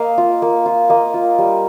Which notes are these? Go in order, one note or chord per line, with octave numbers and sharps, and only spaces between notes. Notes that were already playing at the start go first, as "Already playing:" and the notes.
Already playing: A#3 D#5 F5
F4
A#3
F4
A#3 D#5
F4
G3